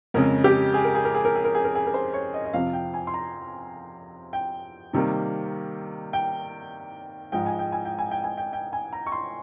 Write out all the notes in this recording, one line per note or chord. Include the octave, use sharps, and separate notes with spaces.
F2 C#3 G#3 A#4
G4
G#4
A#4
G#4
A#4
G#4
A#4
G#4
A#4
G#4
A#4
G#4
A#4
C5
C#5
D#5
D#5
F2 C3 F3 F5
G5
G#5
C6
A#5
G5
C3 D#3 G3 A#3
G5
G#2 F3 G#3 G5
G#5
G5
G#5
G5
G#5
G5
G#5
G5
G5
G#5
A#5
C#6
C6